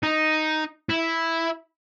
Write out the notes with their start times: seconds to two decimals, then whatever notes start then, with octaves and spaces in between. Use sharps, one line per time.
0.03 D#4
0.89 E4